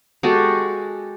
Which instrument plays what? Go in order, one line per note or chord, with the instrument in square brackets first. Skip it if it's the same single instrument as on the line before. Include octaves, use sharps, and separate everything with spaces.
[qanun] G#3 F#4 G4 A4